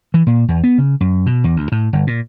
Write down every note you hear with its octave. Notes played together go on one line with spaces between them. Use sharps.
E3
A#2
E2
B3
C#3
F#2
B2
E2
D2
A2
G1
A#2